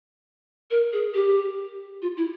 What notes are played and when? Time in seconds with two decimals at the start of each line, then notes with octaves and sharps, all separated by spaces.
0.71 A#4
0.93 G#4
1.14 G4
2.02 F4
2.17 E4